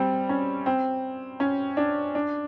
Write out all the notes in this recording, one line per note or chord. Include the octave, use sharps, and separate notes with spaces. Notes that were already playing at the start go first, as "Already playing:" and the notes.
Already playing: G3 C4
C#4
C4
C#4
D4
D4